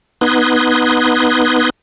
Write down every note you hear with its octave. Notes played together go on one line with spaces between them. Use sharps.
B3 D#4 B4 C6 D#6 G#6